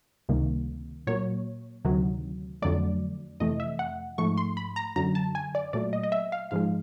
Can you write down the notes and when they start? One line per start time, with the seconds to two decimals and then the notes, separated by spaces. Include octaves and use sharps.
0.29 C#2 C3 D#3 G3 A#3
1.07 A#2 F#3 A#3 C#5
1.85 D2 C3 D#3 F#3
2.62 F2 D3 F#3 A3 D5
3.40 F2 C3 E3 A3 D#5
3.60 E5
3.79 F#5
4.18 G#2 F3 A3 C#6
4.38 C6
4.57 B5
4.76 A#5
4.96 F#2 D3 F#3 A#5
5.15 A5
5.35 G#5
5.55 D5
5.73 A#2 F#3 A3 D5
5.93 D#5
6.03 D#5
6.12 E5
6.32 F5
6.51 G#2 F3 G#3 F5